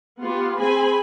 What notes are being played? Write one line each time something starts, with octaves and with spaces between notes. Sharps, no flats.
B3 F4 G4
C4 G#4 G#5 B5